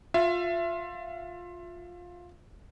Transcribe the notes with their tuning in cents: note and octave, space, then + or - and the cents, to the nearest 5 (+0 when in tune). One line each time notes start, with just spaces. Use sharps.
F4 +15 E5 +30